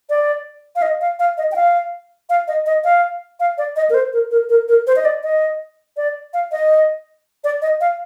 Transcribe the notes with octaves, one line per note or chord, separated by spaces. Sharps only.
D5
F5
D#5
F5
F5
D#5
G5
F5
F5
D#5
D#5
F5
F5
D5
D#5
A#4
C5
A#4
A#4
A#4
A#4
C5
D#5
D5
D#5
D5
F5
D#5
D5
D#5
F5